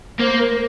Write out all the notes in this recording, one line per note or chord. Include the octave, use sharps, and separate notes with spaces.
A#3 C5
A#4